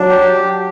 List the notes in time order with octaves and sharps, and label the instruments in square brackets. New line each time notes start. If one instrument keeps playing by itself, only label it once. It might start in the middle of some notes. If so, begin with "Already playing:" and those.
Already playing: [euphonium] F#3 [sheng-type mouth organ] D4
[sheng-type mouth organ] G4